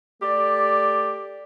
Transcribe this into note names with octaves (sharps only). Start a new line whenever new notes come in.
A3 G4 D5